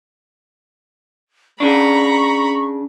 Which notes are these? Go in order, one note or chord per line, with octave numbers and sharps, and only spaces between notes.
C#3 D4 A#5 B5 C#6